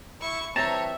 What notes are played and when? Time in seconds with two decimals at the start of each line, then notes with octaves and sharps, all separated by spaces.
0.21 E4 C#6
0.56 E3 G3 C4 C#5 E5 A5 A#5